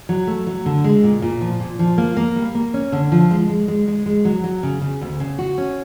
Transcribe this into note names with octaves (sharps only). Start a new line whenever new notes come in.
F#3
A3
F#3
D3
G#3
A#2
A#2
F3
A#2
F3
A#3
A#3
G3
A#3
C#4
D3
F3
G#3
G#3
G#3
G#3
G#3
F#3
F#3
C#3
C#3
D2
C#3
F#4
C#4